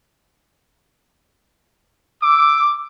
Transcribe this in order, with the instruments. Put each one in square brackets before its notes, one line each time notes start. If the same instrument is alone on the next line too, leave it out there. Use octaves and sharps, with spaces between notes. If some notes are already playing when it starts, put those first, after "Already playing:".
[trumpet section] D6 [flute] E6